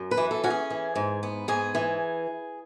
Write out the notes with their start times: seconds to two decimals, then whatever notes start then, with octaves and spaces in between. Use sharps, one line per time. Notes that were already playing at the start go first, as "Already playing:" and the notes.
Already playing: F#2
0.11 B4
0.17 E3
0.31 A4
0.44 C#4 F#4
0.50 G#4
0.70 E3
0.96 G#2
1.23 B3
1.48 G#2 G#4
1.75 E3